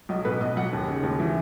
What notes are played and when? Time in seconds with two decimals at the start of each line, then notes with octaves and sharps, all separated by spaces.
0.09 B1 D#5
0.25 B2 B4
0.41 B2 D#5
0.56 B1 F#5
0.73 D#2
0.88 C#3
1.03 D#2
1.20 E3